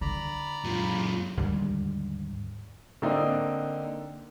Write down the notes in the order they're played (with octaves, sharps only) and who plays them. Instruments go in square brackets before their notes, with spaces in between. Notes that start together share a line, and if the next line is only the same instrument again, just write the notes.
[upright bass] D3 [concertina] D5 A#5 B5
[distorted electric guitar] F#2 A#2 [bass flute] F4
[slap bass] D#2 G#2 D3 G3
[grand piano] D3 A#3 C4 D4 D#4